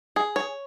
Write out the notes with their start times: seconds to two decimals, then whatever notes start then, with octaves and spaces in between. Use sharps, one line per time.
0.16 G#4
0.36 C#5